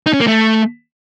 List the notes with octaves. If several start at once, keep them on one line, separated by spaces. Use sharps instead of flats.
D#4
C#4
A#3
A3